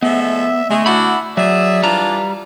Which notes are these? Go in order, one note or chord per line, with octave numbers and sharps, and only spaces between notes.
F3 G#3 A3 B3 E5
G#3 A3
D4 E4 F#4 F#5 B5
F#3 G#4 D5 E5
E3 G3 D4 F4 A#5